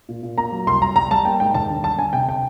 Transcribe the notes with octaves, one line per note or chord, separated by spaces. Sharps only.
A#2
A#2
A#3 A#5
F#3
C2 C6
C2 A#5
G3 A#5
G3 A5
A#3 G5
G#2 G5
D#2 A5
D3
G3 A5
D3 G#5
C3 G5
G5